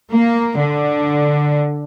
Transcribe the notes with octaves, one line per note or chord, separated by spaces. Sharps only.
A#3
D3